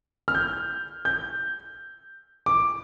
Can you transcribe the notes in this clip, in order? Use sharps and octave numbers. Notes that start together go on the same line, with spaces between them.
F6
G6
G6
D6